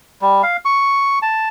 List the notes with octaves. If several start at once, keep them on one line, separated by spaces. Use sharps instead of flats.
G3
F5
C#6
A5